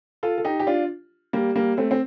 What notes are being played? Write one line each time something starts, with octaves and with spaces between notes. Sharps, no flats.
F4 A4
A4
D#4 G4
G4
D4 F4
G3 A#3
G3 A#3
A3 C4
C4